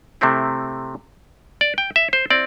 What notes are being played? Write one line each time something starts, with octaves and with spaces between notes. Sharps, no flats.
C3 A3 C4 E4
D5
G5
E5
C5
C4 E4 D5